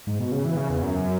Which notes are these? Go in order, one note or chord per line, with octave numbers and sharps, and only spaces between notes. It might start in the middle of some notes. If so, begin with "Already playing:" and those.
G#2
B2
C#3
E3
C#3
E2
F#2